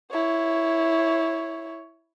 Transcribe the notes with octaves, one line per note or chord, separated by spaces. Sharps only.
E4 C#5